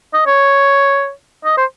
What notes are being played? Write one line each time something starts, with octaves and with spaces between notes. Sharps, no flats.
D#5
C#5
D#5
C5